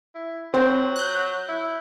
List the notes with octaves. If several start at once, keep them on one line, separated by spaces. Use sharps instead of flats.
E4
F#3 C4 C5
F#6 G6
E4